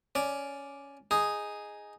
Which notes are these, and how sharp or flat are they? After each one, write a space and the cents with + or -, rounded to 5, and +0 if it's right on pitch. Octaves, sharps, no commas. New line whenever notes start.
C#4 +10 D5 +0
D#4 +0 G#4 +0